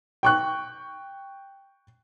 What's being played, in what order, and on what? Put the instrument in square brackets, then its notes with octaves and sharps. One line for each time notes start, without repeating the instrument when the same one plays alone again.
[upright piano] G5 C#6 F#6